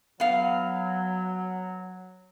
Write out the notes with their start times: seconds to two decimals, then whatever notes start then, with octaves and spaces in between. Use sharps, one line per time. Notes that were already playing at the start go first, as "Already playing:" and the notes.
0.20 F#3 B3 F5